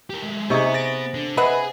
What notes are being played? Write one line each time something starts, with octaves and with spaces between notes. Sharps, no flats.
G4 A#4
G#3 A3
C3 B3 D#4 G#4 D#5 C#6
A6 A#6 D7
D3
G#4 B4 D#5 E5 F#5